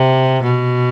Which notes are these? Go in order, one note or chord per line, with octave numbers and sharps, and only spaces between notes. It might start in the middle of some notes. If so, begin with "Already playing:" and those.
Already playing: C3
B2